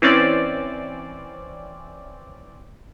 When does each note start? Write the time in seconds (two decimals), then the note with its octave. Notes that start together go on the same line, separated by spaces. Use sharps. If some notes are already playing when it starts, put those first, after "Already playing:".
0.02 E3 C4 C#4 D5